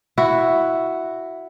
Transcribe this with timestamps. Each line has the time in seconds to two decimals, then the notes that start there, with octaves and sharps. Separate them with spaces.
0.18 E4 F#4